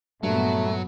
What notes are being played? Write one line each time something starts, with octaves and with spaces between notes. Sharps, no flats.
G2 A#2 F#3 A3 B3